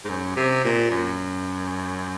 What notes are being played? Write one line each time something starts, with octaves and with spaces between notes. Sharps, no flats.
G#2
F#2
C3
A#2
F#2